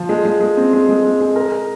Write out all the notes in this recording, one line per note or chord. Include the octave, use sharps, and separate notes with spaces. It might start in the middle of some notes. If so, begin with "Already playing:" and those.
Already playing: F3
G#3
G#3
G#3
C4
G#3
G#3
G#3
G#3
A#4
A#4